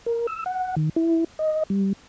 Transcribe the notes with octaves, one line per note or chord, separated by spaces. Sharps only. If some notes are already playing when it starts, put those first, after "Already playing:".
A#4
E6
F#5
D#3
E4
D#5
G3